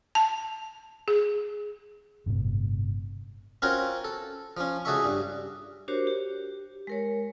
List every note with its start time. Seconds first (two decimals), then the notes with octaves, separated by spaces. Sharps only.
0.15 A5
1.08 G#4
2.26 G1 A2 C3
3.62 C4 C#4 F4 F#4 A#4 C#5
4.04 A4
4.57 F3 C#4
4.85 C#2 F#4 G#4 A4 E5 C#6
5.04 G2
5.88 D4 F#4 G4 A#4 C5 C#5
6.07 G4
6.87 G#3 A#4 C#5